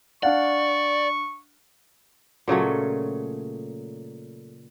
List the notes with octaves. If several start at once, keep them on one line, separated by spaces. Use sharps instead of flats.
D4 D5 F5 F#5 C#6
A#2 C#3 F#3 A3